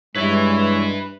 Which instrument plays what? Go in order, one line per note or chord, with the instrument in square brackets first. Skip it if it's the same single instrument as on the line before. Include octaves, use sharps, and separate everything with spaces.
[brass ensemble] G2 [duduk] G#3 [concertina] E4 C#5 [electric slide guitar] B4 E5